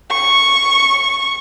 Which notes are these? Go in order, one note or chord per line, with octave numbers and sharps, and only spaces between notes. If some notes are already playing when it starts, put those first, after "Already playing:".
C#6